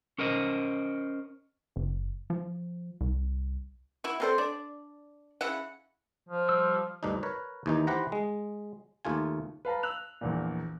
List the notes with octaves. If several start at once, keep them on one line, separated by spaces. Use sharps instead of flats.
C#4 A#4 C5 D#5
F#1
F3
C2
E4 F#4
C4 F#4 A4 A#4 C5 D5
D4 D5
C#3 E4 F#5
F3
G3 C5 E6
D2 G2 D4 D#4
A#4 B4 C#5
D#2 E3 D#4
E3 G4 B4 C5 F#5 A#5
G#3
D#2 A3 F4 G#5
B4 F5 A5 A#5
E6 F#6 F7
A#1 E2 A#2